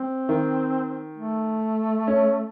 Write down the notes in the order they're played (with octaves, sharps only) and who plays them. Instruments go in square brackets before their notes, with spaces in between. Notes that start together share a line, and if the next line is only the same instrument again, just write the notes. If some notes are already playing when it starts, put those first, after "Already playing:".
Already playing: [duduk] C4
[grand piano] D#3
[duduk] A3
[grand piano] C#4